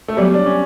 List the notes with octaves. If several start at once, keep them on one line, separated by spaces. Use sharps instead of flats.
A3
F#3 G3 B3 F#4 C#5
D4
C#4